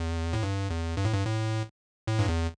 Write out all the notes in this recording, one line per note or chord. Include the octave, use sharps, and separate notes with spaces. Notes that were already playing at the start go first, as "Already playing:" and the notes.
Already playing: E2
A2
G2
E2
G2
A2
G2
A2
A2
G2
E2